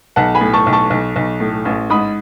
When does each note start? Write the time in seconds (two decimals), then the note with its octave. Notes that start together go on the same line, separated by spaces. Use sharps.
0.16 B1 F#5 A5
0.35 G#5 B5
0.41 A2
0.53 A5 C#6
0.66 B1
0.73 A5 C#6
0.90 B1
1.16 B1
1.40 A2
1.65 A1
1.90 G#2 B5 D#6